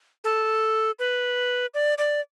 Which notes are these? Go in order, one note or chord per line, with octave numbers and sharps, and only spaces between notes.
A4
B4
D5
D5